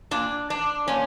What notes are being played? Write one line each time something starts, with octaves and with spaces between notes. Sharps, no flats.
A#2 D4
D4
A#2 C#4